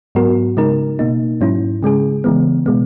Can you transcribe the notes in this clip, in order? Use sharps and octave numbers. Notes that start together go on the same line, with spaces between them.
G#2 F#3 B3 F#4 A#4
C#3 G#3 D#4 A#4
B2 A#3 D#4
G#2 F#3 C#4 E4
C#3 G#3 C#4 G#4
C#3 E3 G#3 B3
B2 G#3 B3